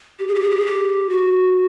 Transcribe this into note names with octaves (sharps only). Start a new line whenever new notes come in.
G4
G#4
G4
G#4
G4
G#4
G4
F#4